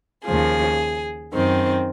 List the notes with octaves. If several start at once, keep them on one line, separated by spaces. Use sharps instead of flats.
D#2 C#3 F3 G#4
F#2 D#3 C4